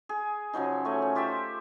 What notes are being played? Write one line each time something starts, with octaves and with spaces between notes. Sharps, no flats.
G#4
C#3 F3 F#3 D#4
A3 C#5 G#5
C#4
F4 G4 C5 E5